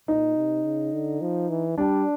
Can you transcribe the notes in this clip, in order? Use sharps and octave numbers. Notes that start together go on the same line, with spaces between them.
A#2 D#4
C3
C#3
D3
F3
E3
G3 D4